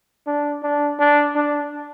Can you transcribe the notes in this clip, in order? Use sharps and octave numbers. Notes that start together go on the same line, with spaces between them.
D4
D4
D4
D4